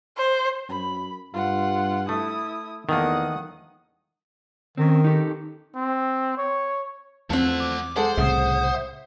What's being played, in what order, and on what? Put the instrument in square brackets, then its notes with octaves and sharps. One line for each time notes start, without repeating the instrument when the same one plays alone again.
[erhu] C5
[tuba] F#2 [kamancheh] B5
[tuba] G2 [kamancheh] F4 F#5
[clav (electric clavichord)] A3 [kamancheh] E4 D#6
[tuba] E2 [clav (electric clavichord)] D#3 A3 A#3 [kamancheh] F#5 D#6
[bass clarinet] D#3 [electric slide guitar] C4 C#4
[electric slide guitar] D#4 G4 A4
[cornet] C4
C#5
[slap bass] E2 [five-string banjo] F3 C4 [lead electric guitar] A3 F#5
[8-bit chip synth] D6
[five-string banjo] G#3 G#4 A4 [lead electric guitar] C5 [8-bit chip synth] F#5
[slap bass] C2 A2 C#3 [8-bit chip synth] E5 F#5 D#6